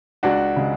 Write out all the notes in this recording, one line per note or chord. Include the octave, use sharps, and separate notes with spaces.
C#2 D4 F#4
C#3 G#3